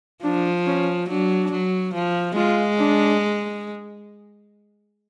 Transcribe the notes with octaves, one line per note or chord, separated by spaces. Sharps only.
F3 D4
C#4
F#3 D4
F#3
F3
G#3 F4
D4